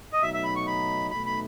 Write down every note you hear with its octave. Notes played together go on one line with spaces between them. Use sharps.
D#5
B2 F#3 A3 D#4 E5
E5
B5
C#6
B5
B1 B2 A3 D#4 B5
B5